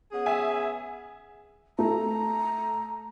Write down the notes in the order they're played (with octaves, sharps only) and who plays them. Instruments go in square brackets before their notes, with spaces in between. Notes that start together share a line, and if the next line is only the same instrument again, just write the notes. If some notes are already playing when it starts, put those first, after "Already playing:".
[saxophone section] B3 C#4 G#4
[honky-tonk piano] E5 G#5
[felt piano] A3 [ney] A#5